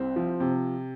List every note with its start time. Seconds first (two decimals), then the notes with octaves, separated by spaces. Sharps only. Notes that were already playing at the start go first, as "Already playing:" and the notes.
Already playing: C2 C4
0.16 F3
0.40 C3